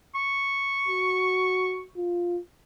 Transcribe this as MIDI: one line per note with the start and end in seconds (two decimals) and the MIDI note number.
0.15 1.85 85
0.88 1.84 66
1.97 2.38 65